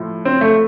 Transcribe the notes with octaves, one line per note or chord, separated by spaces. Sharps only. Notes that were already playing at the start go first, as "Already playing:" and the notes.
Already playing: A2 F3
C4
A3